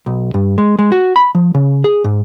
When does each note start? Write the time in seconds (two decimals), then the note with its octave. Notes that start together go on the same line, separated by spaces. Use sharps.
0.06 B1
0.34 G2
0.58 G#3
0.79 G#3
0.92 F#4
1.16 B5
1.35 F3
1.54 C#3
1.84 G#4
2.04 G#2